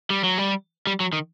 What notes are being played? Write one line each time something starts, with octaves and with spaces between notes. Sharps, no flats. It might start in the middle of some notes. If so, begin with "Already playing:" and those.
G3
F#3
G3
G3
F#3
D#3